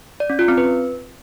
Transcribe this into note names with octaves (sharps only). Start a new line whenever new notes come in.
D5
C#4
F4
C4
B4